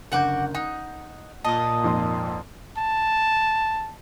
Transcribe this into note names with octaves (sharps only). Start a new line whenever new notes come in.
F#1 D3 F#4 F#5 D6 G6
D#4 F#5
A#2 D#5 A5 D#6
F2 G#2 C6
A5